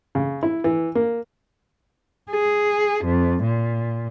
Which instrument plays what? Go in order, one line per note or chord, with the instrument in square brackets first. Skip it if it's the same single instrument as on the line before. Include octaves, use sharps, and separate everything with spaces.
[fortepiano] C#3
E4
E3
A#3
[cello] G#4
F2
A#2